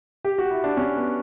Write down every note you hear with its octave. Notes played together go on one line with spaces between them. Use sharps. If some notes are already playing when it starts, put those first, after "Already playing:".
G4
F#4
E4
D4
C#4
B3